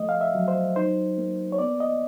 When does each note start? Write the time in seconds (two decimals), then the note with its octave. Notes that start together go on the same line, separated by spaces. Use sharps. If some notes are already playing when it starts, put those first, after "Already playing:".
Already playing: F3 A3 D#5
0.09 F5
0.21 E5
0.35 F#3
0.48 C5
0.76 D#4 C5
1.18 A#3
1.52 C#5
1.59 B3 D5
1.80 D#5